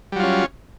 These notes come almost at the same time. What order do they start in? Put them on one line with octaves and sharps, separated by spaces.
G3 F#3 F4 C#4